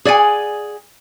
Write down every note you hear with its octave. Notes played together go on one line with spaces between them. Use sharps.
G#4 D5 F#5 G#5